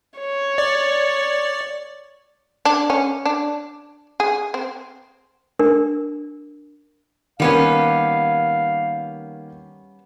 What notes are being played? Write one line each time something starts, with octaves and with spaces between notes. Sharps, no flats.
C#5
D5
D4
C#4
D4
G#4
C4
D4 A#4
D#3 G3 A#3 B3 C#4 F5